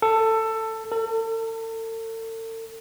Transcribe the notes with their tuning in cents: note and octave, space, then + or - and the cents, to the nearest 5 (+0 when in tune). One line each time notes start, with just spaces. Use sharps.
A4 +15
A4 +40